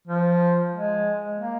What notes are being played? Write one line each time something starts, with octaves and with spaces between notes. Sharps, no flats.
F3
G#3
A#3